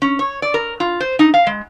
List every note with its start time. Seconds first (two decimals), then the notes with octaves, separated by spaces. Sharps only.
0.02 C#4
0.19 C#5
0.42 D5
0.54 A#4
0.80 F4
1.00 C5
1.19 D#4
1.34 F5
1.47 G#3